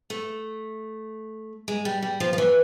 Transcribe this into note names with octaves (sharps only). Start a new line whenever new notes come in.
A3
G#3
G3
G3
F3
F3
E3